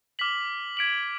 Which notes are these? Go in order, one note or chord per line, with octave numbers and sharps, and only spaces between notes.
D6 F6 B6 F#7
G#6 B6 D7 F#7